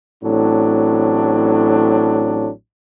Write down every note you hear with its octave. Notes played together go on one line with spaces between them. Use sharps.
A1 A2 F#3 C4 D4